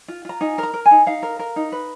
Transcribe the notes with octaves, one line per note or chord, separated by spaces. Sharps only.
F4
F4 A#5
D#4 G#5
A#4
A#5
A#4
G#5
D#4
D#4 F5
A#4
A#4
D#4
B4